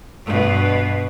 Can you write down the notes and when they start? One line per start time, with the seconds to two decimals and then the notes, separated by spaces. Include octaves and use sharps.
0.25 G2 B2